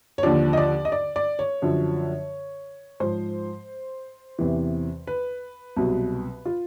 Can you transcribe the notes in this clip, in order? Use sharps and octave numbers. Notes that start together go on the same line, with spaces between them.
C#5
D#2 D3 F3 D5
D#5
D5
D#5
D5
D5
C#5
F#2 D3 F3
G#2 F3 C5
E2 C3 E3
B4
C2 B2 F#3
F4